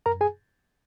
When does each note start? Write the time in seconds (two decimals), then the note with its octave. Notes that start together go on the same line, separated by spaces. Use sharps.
0.06 F#2 A#4 A#5
0.21 G#4 G#5